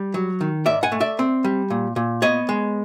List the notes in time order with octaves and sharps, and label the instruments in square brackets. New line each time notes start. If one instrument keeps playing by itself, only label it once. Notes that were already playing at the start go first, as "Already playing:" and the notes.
Already playing: [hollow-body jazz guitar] G3
F#3
D#3
G#2 D5 E5
F#5 G#5
A3
D5 E5
C4
G3
A#2
A#2
B3 C#5 D#5
G#3